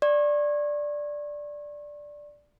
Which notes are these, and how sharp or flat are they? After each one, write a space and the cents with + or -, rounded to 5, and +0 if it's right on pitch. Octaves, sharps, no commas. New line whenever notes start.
D5 +0 C#6 -40